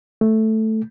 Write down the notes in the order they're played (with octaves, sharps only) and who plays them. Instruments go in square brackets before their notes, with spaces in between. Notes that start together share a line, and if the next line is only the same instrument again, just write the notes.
[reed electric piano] A3